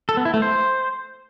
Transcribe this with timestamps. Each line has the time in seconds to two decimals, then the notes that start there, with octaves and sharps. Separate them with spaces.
0.09 A4
0.17 B3
0.25 E4
0.34 A3
0.42 C5